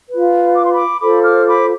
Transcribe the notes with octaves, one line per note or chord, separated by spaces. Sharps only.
F4 B4
D6
C6
B5 D6
F4 A4 C5 B5 D6
D6 F6
B5 D6